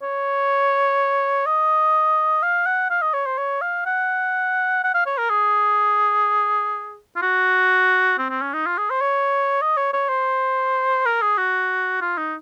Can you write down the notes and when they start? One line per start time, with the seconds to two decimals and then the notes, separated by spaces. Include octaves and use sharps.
0.02 C#5
1.46 D#5
2.43 F5
2.66 F#5
2.90 F5
3.02 D#5
3.14 C#5
3.26 C5
3.38 C#5
3.61 F5
3.86 F#5
4.84 F#5
4.94 F5
5.06 C#5
5.18 A#4
5.30 G#4
7.16 F4
7.22 F#4
8.18 C4
8.30 C4
8.42 C#4
8.53 D#4
8.66 F4
8.78 G#4
8.90 C5
9.01 C#5
9.62 D#5
9.77 C#5
9.93 C#5
10.09 C5
11.06 A#4
11.22 G#4
11.38 F#4
12.01 F4
12.18 D#4